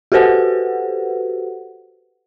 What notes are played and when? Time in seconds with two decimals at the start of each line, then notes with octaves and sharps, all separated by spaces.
0.12 F#4 G4 A4 B4 C5 F#5